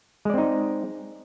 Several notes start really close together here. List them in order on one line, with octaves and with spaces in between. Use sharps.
G#3 D5 C4 D#4